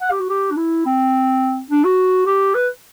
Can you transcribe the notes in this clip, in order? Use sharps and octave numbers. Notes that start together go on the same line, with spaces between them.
F#5
G4
F#4
G4
D4
E4
C4
D4
F#4
G4
B4